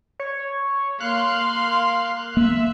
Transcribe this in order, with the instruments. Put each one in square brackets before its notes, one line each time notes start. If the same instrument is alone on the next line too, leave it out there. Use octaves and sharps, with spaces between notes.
[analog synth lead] C#5
[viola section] A#3 F5 C6 [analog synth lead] F#6
[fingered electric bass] A#3 [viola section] E5